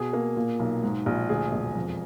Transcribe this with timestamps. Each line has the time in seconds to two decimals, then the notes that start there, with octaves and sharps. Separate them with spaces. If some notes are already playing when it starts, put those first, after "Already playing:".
Already playing: B2 G#4
0.13 A#3
0.36 A#2
0.60 B1
0.83 G#2
1.06 A#1
1.29 D2 G#4
1.52 E1
1.75 F2